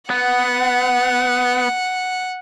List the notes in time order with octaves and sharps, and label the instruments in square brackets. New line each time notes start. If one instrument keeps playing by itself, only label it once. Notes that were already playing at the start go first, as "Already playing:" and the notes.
[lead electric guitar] B3 [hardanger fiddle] F#5